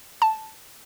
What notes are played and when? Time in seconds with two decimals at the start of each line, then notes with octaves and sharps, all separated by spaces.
0.22 A5